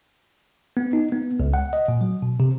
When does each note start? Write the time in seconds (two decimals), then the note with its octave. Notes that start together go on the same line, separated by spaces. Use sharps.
0.77 B3
0.93 D#4
1.12 B3
1.40 C#2
1.54 F#5
1.73 D#5
1.88 A#2
2.01 F#3
2.22 B2
2.40 C3